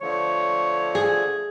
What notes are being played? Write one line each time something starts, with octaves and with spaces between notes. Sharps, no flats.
D3 F3 A3 C#5
G#4